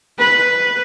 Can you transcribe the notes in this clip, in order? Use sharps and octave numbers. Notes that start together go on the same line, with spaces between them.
B4